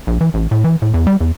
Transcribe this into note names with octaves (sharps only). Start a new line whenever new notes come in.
A#1
E3
A1
A2
E3
A2
E2
G3
E2